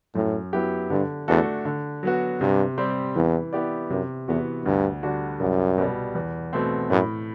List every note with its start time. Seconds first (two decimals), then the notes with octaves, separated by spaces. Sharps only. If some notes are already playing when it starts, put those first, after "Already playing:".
0.15 F#2 A2
0.53 F#3 B3 E4 G4
0.90 G2 D3
1.28 E2 A3 D4 F#4 A4
1.65 D3
2.03 F#3 B3 F#4
2.41 G2 C3
2.78 G3 C4 G4
3.15 E2 E3
3.53 B3 E4 G4 D5
3.90 F#2 C3
4.28 E2 E3 B3 F#4
4.66 D2 G2
5.03 D3 G3 D4 F#4
5.40 C2 F#2
5.78 B2 G3
6.15 E2
6.53 B2 A3 C4
6.90 F#2 A2